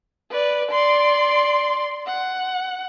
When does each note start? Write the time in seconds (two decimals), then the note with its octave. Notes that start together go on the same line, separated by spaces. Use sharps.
0.31 B4 D5
0.71 D5 C6
2.07 F#5